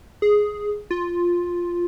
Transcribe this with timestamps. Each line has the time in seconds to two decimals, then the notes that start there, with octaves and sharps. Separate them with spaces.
0.22 G#4
0.90 F4